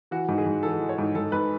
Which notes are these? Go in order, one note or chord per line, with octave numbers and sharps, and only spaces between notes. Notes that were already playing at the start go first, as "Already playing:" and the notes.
E3 F#4
G#2
G#4
G#2
E3 A4
E3
C#5
G#2
G#2 A4
G#2 B4